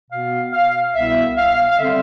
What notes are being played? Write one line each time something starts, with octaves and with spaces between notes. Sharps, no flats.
B2 B3 F5
F5
C2 B2 B3 E5
F5
F5
D3 G3 C4 E5